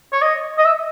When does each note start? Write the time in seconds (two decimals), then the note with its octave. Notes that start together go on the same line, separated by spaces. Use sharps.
0.13 C#5
0.22 D#5
0.58 D#5
0.65 E5